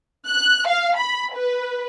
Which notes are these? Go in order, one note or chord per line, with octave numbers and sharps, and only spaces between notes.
F#6
F5
B5
B4